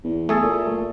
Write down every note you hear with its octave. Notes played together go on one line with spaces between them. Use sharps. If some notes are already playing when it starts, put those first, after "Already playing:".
E2
A3 G#4 A4
A#2